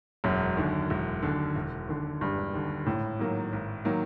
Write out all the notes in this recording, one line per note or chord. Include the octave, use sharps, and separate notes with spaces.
E1 F#2
D#2 D3
E1
D#2 D3
E1
D#2 D3
E1 G2
D#2 D3
G#1 A2
G#2 D#3 F#3 A#3
G#1
D#3 F#3 A#3